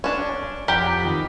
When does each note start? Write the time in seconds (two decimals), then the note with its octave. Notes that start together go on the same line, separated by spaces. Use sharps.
0.04 C#4 D4
0.68 F2 G4 A#4 F#5 B5
1.05 D#3